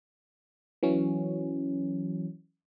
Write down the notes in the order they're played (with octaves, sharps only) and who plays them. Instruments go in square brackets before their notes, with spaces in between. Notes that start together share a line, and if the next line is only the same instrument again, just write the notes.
[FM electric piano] E3 F#3 C#4